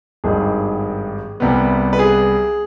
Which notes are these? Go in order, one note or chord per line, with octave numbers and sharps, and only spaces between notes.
G#1 G2 D#3 G3 G#4
C2 C3 G3 B3
B4
G#4